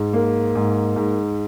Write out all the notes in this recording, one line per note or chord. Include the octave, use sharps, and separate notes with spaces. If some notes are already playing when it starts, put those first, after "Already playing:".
Already playing: G#2
A#3
G#2
G#2